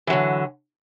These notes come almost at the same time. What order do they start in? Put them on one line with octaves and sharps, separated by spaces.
E3 F#3 D3